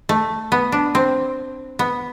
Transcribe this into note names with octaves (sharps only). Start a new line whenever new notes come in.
A3
B3
D4
C4
B3